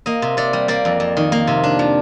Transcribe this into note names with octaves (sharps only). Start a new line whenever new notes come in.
A#3 D#5
C3
C3 D5
G3
A#3 D5
F2
F2
D#3
A#3
C3
D4
F3